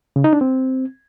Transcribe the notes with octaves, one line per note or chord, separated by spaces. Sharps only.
C#3
D#4
D4
C4